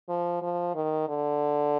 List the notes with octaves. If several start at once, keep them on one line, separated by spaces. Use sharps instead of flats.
F3
F3
D#3
D3